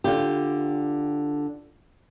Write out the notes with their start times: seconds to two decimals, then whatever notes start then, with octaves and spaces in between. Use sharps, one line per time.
0.04 D3 F4 G4